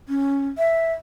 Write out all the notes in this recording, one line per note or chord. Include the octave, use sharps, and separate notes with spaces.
C#4
E5